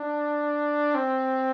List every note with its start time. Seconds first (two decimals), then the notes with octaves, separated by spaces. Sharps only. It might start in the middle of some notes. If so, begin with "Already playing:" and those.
Already playing: D4
0.95 C4